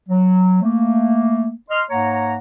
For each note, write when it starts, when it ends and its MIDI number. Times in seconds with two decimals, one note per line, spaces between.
0.08 0.59 54
0.62 1.52 57
0.62 1.52 58
1.71 1.83 75
1.71 1.83 84
1.71 1.83 89
1.90 2.37 44
1.90 2.37 58
1.90 2.37 73
1.90 2.37 78
1.90 2.37 82